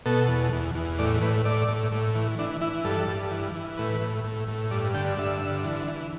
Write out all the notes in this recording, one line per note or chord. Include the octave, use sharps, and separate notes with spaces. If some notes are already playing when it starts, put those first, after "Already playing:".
B2 A4
E2
E2
E2
A2 D5
A2 B4
A2 D5
A2
A2
E3
E3 D4
E3 E4
G2 A4
G2
E3
E3
A2 B4
A2
A2
A2
G2 D5
D3 G5
G2 E5
D3
E3
E3